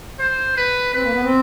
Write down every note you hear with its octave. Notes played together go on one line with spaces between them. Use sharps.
C5
B4
C4 B4
A#3
B3
C4